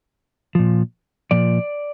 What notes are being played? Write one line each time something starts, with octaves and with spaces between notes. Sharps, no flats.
A#2 F3
A#2 F3 D5